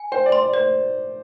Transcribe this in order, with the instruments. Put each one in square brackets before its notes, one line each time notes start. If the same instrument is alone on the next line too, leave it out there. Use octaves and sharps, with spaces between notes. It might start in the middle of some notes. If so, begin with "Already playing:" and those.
Already playing: [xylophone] G#5
[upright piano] C5 [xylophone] G5
[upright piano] D5
[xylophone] C6
[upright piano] D5
[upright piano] C5 [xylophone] D5